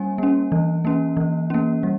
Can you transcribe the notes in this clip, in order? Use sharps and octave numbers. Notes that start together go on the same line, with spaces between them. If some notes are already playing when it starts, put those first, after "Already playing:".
Already playing: G3 A#3 C#4 G#5
A#3 C#4
E3
A#3 C#4
E3
A#3 C#4
G3